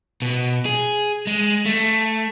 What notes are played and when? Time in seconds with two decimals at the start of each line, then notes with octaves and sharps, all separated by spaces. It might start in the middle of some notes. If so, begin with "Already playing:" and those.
0.22 B2
0.66 G#4
1.27 G#3
1.66 A3